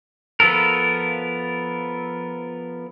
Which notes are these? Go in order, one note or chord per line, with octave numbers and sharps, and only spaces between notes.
F3 B3 A4 A#4